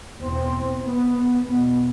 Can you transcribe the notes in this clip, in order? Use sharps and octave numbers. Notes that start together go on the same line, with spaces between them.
E2 B2 C4
B3
E2 B2 B3